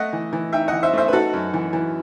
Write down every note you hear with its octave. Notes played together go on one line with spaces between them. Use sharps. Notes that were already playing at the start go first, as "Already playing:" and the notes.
Already playing: A3 D#5 F#5
E3
E3
D#4 E5 G5
E3 D#5 F#5
C5 E5
A3 C5 E5
B4
D#4 F#4 A4
F#2
E3
E3